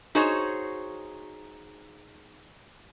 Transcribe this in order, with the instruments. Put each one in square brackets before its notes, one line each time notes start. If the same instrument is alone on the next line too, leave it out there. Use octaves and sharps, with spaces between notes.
[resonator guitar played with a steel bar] D#4 F#4 G#4 C5 C#5 D#5